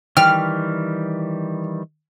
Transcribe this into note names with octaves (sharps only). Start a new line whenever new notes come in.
D#3 E3 G3 G5 F6